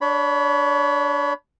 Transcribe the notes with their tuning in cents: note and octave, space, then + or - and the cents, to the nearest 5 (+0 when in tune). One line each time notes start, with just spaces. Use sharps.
D4 +0 C#5 +30 B5 +0